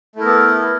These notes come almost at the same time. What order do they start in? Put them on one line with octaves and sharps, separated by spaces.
A3 E4 A#4 B3 A4